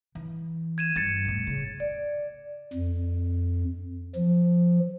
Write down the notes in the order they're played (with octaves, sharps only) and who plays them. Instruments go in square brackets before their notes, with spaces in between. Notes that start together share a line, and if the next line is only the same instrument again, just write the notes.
[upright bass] E3
[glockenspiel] G#6 D#7 E7
[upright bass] G2 [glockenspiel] G#6 A6 C#7
[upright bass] E2 A2
C#3
[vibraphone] D5
[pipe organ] F2
F3